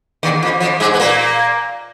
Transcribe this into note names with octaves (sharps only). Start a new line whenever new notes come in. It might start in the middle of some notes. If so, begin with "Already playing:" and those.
D#2 D#3
F2 F3
F2 F3
G#2 G#3
B3
A#2 A#3